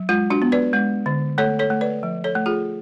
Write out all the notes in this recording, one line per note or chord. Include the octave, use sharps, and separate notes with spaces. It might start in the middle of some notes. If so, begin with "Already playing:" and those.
Already playing: F#3
G#3 F4
D4 F#4
B3
B4 D5
G#3
D3
A3 A4 C#5
A4 C#5
A3
B4 D5
F3
A4 C#5
A3
F4 G#4